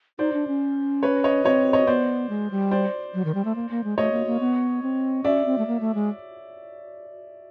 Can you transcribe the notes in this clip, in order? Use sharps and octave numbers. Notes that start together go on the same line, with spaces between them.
D#4 C5 D5
D4
C#4
B4 C#5
C#5 D#5
C4 C#5 D#5
C#5 D#5
B3 C5 D5
G#3
G3
C5 D5
F#3
D#3
G3
A3
A#3
A#3
G#3
A3 C#5 D#5
A#3
A#3
B3
C4
C#4 D5 E5
C4
A3
A#3
A3
G#3